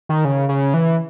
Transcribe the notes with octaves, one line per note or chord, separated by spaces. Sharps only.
D#3
C#3
C#3
E3